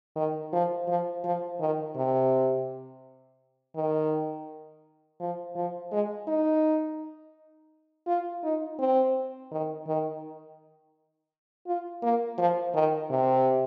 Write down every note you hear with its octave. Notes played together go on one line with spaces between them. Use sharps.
D#3
F3
F3
F3
D#3
C3
D#3
F3
F3
G#3
D#4
F4
D#4
C4
D#3
D#3
F4
A#3
F3
D#3
C3